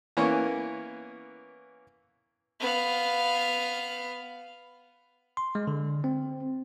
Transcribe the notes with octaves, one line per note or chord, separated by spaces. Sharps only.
E3 A#3 B3 C#4
B3 F5
C6
G#3
D3
C4